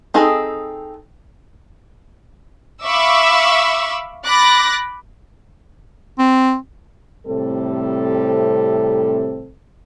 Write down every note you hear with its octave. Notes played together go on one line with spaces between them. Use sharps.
C4 D#4 G#4 A4
E5 F5 B5 C#6 D6 E6
B5 D6 F#6 A6 A#6
C4
A2 C3 G3 C4 A4